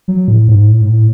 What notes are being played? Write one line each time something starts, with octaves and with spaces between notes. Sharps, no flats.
F#3
A2
G#2
A2
G#2
A2